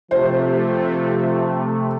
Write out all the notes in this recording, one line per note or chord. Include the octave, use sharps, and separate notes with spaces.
C3 F3 A3 C5